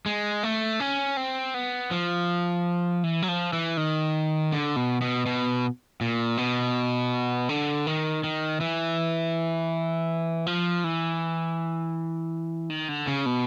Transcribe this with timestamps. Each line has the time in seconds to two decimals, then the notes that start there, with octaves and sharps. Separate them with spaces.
0.06 G#3
0.43 A3
0.80 C#4
1.17 C4
1.54 B3
1.91 F3
3.04 E3
3.22 F#3
3.28 F3
3.53 E3
3.77 D#3
4.52 D3
4.76 B2
5.01 B2
5.26 B2
6.01 A#2
6.37 B2
7.49 D3
7.87 D#3
8.24 D#3
8.60 E3
10.47 F3
10.84 E3
12.70 D#3
12.89 D3
13.07 C#3
13.26 B2